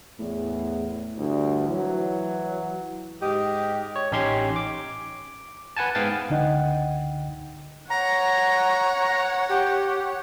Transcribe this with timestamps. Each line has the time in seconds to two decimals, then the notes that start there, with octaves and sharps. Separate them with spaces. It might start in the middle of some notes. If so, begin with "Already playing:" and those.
0.19 E2 A2
1.18 D2 G2
1.68 E3 F#3
3.21 G#2 D#4 G4
3.96 C#5
4.12 A1 C#4 D#4 G4 C6 G#6
4.56 D6
5.77 B4 F#5 G#5 A5
5.95 G#2 B3 F5 G5 G#5 A6
6.30 C#2 D3 D#4 D#5 F#5 G5
7.90 C#5 F#5 A#5
9.49 G4